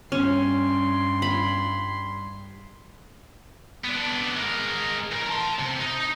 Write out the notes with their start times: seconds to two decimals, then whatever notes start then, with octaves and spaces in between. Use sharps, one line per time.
0.12 G2 C#4 C6
1.22 B5
3.85 B3 D4
4.37 G#3 A#4
5.11 E2 A#4
5.29 A5 C6
5.59 C3
5.81 D#4